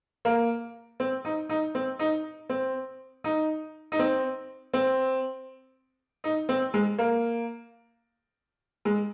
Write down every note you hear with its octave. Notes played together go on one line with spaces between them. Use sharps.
A#3
C4
D#4
D#4
C4
D#4
C4
D#4
D#4
C4
C4
D#4
C4
G#3
A#3
G#3